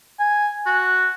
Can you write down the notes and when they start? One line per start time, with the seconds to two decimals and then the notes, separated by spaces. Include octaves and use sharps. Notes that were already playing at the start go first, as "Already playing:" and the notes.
0.19 G#5
0.66 F#4